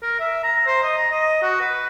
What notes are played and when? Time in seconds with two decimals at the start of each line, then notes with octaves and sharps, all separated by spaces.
0.02 A#4
0.20 E5
0.44 A#5
0.67 C5
0.83 D#5
0.97 A#5
1.11 D#5
1.42 F#4
1.61 B4